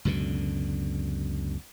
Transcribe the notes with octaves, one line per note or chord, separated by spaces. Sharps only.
C#2 F#2 B2 D3